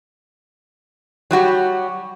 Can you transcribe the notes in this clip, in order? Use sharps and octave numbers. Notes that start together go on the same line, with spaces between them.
F#3 G3 F#4 G4